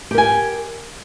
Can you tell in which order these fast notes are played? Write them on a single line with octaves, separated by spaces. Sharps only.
G4 A#4 G#5